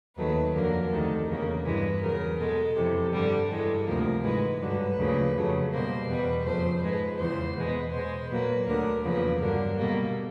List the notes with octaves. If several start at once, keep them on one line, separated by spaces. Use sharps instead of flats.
D#2 D#3 F#3 A3 B4
F2 D3 F#3 A#3 A#4
D2 C3 D#3 A4
E2 C#3 F#3 A#3 A#4
G2 E3 G#3 B4
E2 C#3 F#3 A#4
B2 G#3 A4
F2 C3 E3
G2 D3 G3 A4
G2 E3 G#3 A4
D2 C3 F3 A#3 A#4
G#2 E3 G#3 B4
G2 D3 F#3 B4
D2 C#3 F3 A#3
F2 C#3 F#3 A3
B2 G3 A#3 C5
E2 B2 G3 B4
F2 C#3 F3 A3 C5
G#2 F3 G#3 B4
E2 C#3 E3 C5
E2 B2 G#3 B4
B2 G#3 C5
A#2 F#3 A#3 B4
D2 D3 F#3 A#4
E2 C#3 F3 A#3 B4
G2 D3 F#3 A#4
B2 G3 A#3 A4